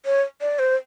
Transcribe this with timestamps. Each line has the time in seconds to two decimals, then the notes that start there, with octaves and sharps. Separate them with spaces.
0.06 C#5
0.41 D5
0.59 C5